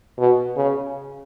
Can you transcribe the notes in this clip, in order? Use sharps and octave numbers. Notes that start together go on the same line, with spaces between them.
B2
C#3